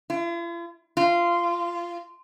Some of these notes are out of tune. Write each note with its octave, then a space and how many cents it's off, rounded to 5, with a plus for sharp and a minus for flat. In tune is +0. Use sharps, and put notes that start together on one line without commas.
F4 -45
F4 -15